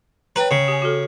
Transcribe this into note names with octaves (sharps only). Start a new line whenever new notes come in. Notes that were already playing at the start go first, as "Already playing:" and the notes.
B4 C#5 G5 A#5
C#3
G4 G#5
F#4 A4